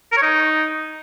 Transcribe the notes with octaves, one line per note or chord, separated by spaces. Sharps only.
A#4
C#5
D#4